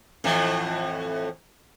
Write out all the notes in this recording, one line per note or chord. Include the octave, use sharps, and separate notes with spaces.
F2 A2 E3